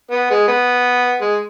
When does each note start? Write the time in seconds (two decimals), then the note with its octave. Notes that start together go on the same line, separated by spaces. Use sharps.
0.11 B3
0.30 G#3
0.48 B3
1.22 G#3